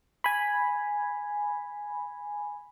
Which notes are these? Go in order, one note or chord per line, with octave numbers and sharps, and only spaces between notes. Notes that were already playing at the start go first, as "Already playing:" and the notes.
G#5 B5